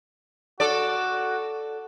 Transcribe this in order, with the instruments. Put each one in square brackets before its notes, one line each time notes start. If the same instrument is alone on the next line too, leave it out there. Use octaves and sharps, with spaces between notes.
[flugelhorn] F#4 [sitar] A4 D5